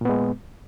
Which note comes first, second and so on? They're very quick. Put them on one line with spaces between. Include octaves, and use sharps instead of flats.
A#2 B3 G#3